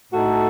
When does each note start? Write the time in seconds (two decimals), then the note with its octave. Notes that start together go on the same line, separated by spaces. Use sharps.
0.12 A2 A3 D#4 F#4 A4